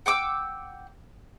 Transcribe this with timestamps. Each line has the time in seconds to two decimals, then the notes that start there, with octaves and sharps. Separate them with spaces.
0.06 F#5 G5 D6 E6